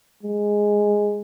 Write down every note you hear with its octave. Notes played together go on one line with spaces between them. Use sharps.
G#3